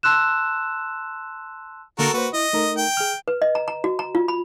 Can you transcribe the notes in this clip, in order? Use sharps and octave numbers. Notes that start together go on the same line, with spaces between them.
A5 C6 E6 F#6 E7
D3 A#3 F#4 A4 A#4
A#3 F#4 B4 C5
E4 D#5
A3 D#4 A#4
G5
G#4 F6
B4
D#5
A#5
A#5
F#4
A#5
F4
B5